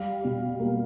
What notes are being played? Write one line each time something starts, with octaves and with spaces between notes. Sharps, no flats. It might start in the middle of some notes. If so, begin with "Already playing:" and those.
Already playing: G3 F5
B2
A#3